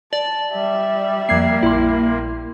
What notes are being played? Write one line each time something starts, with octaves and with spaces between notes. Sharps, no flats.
D5 A5
G3 E5
F2 A#3 G#6 C7
A#1 E4 C6